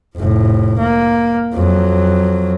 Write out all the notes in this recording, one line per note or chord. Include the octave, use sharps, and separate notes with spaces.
F1 A2
A#3
F2 F#3